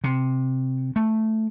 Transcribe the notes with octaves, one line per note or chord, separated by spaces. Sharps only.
C3
A3